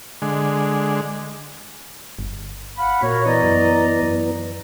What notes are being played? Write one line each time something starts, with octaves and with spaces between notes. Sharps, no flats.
D3 G#3
G1
F5 F#5 B5
A#2 F#4 A#4 C#5
E3 B3 D5 D#5 A#5
F#2
F#2